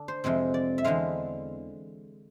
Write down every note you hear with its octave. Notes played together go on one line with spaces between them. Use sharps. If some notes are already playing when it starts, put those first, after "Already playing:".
Already playing: D3 D4 A4
C5
F2 C3 G#3 C4
D5
E5
E2 D3 G#3 C4 F5